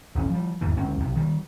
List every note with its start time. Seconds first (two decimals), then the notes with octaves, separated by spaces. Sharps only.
0.15 D#1 G#1 C#4
0.30 F3 G3
0.61 G#1 E2 G#2 E3
0.77 G1 C#2 G#3 C#4
1.00 B1 C3
1.15 D#3 E3 G3